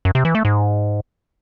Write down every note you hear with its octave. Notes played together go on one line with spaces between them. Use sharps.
F#2
C3
E3
A3
G#2